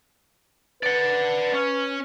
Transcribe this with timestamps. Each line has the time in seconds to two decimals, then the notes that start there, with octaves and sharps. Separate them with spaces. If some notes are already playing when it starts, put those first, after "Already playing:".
0.83 B4 D5 F#5
1.53 C#4